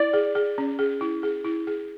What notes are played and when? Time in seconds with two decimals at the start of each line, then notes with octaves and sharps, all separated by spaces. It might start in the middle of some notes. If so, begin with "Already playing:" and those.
Already playing: E4 D5
0.13 G#4
0.35 G#4
0.58 C#4
0.79 G#4
1.01 E4
1.23 G#4
1.45 E4
1.67 G#4